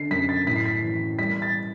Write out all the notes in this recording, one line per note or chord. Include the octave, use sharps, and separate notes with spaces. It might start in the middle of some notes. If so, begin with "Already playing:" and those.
Already playing: D3 C7
F#2 B6
A6
A2 B6
C7
B6
E3
G3 B6
A6